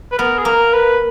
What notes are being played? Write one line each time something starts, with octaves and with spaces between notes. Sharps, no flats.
B4
B3 A#4
G#4
A#3 A#4
B4